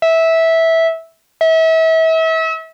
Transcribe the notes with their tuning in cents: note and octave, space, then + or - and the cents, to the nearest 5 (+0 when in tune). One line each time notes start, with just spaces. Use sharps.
E5 -15
E5 -35